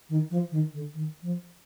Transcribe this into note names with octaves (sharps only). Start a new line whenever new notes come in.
D#3
F3
D#3
D3
D#3
F3